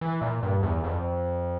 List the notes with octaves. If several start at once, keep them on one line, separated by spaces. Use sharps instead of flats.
E3
A#2
G2
E2
F2